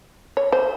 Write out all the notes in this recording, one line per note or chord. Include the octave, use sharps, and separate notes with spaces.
C#5
C5